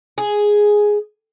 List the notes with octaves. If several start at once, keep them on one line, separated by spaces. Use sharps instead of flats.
G#4